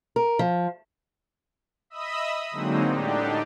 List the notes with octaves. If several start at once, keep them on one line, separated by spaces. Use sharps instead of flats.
A#4
F3
D#5 E5 B5 D#6 E6
D3 F#3 G#3 A#3 C4 D#4
A2 D3 D4 D#4 G4